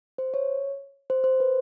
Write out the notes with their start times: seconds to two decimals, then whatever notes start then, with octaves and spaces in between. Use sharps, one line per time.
0.18 C5
0.34 C#5
1.10 C5
1.24 C5
1.40 B4